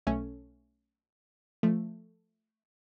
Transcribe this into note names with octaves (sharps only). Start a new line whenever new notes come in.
B1 A3 C#4
F3 A3